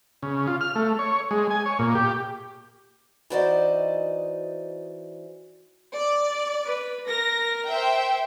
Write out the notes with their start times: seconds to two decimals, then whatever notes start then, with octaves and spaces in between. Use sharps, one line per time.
0.23 C#3
0.47 F4
0.61 F6
0.75 A3
0.99 C#5
1.31 G#3
1.50 G#5
1.66 C#5
1.79 A#2
1.95 G4
3.30 E3 D#4 F#4 C5 D5 D#5
5.93 D5
6.65 B4
7.07 A#4 A#6
7.66 C5 E5 G5